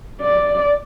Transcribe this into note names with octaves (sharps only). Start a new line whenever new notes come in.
D5